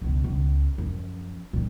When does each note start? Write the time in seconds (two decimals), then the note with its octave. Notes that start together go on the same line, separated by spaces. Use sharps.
0.01 C#2 B2
0.24 C#2
0.78 F#2 F3
1.53 A#2 C4